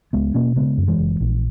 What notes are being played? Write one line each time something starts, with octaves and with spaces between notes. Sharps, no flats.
C#2 G#3 B3
B2 A#3 C#4
C#3 G#3 B3
F#2
E3 G#3
F#1
A#1